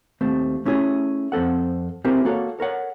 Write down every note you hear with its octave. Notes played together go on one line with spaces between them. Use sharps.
D#2 A3 C4
A3 C#4 E4 G#4
F2 C4 A4 F#5
C4 E4 G4 G#4 A#4 C5
A#3 F#4 A4 C#5
A4 A#4 C#5 F#5